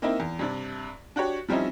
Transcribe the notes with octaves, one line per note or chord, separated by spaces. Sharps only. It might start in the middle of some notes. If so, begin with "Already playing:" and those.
A#3 C4 D#4 E4
E2
G2 C3 D4
D4 F#4 G4 C#5
F3 G3 C4 C#4 D#4 E4